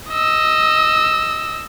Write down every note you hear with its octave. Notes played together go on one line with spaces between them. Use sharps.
D#5 E6